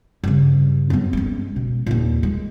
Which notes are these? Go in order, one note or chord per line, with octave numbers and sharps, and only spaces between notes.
G2 C#3
F#2 B3
G#3 C#4
B2
D#2 A#2
G#3